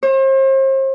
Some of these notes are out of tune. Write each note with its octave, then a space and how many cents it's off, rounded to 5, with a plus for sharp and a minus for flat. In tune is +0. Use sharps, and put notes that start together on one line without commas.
C5 +40